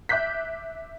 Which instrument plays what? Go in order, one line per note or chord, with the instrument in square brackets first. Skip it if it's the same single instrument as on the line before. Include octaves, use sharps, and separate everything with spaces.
[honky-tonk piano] E5 D6 F#6 G6 B6